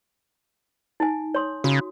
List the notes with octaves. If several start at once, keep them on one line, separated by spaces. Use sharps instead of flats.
D#4 G#5
C#5 C6 D#6
C#3 F#4 D#6